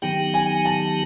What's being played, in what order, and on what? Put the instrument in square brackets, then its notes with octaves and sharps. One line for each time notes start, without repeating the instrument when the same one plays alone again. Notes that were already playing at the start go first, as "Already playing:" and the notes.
[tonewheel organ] D#3 F#3 B3 D#4 G4 [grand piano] G5
[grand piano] G#5
A5